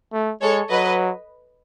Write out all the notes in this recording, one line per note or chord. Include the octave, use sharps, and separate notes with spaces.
A3
G#3 A4 C#5
F#3 B4 D#5